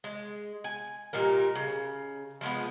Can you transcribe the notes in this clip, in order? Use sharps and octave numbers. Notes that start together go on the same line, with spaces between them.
G#3
G#5
A#2 G3 D#4 A#4
C#3
F3 G#3 B3